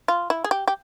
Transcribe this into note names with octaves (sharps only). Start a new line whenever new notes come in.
F4
E4
G#4
G4
G4